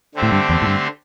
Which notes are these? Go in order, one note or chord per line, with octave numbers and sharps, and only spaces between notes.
D3 A3 C4 G4 C5
A2
G2
E2
A2
G2